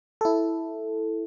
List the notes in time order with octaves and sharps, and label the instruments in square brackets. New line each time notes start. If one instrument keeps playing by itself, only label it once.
[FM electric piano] E4 A4